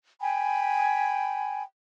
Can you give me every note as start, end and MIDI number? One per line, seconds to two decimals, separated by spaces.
0.21 1.62 79
0.21 1.62 80
0.21 1.62 83